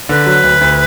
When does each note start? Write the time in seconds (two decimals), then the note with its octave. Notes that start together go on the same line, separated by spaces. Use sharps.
0.09 D3 B4
0.26 F#3
0.43 D2
0.61 D2